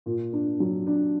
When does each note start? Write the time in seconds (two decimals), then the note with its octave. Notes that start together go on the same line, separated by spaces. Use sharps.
0.06 A#2
0.33 D4
0.60 F#3
0.87 D4